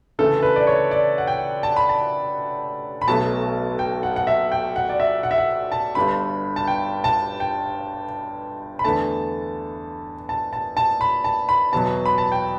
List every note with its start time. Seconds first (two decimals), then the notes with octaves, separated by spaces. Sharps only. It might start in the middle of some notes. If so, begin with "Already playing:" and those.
0.19 D2 C#3 E3 A3 A4
0.42 B4
0.56 D5
0.67 C#5
0.91 D5
1.18 F#5
1.27 G5
1.63 A5
1.76 B5
1.89 A5
3.02 B5
3.08 B1 B2 F#3 A3 A5
3.79 G5
4.03 F#5
4.16 F#5
4.27 E5
4.52 G5
4.76 F#5
4.89 D5
5.00 E5
5.23 F#5
5.31 E5
5.38 F#5
5.72 A5
5.95 G1 G2 D3 B5
6.56 A5
6.68 G5
7.04 A5
7.40 G5
8.79 B5
8.84 E2 D3 A3 A5
10.29 A5
10.53 A5
10.77 A5
11.01 B5
11.24 A5
11.49 B5
11.73 E2 B2 F#3 A5
12.06 B5
12.18 A5
12.32 G5